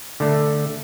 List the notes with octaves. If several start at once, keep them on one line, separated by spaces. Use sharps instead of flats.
D3 A3